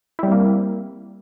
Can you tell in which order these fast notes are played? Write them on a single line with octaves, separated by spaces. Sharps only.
E4 G3 C4 A#3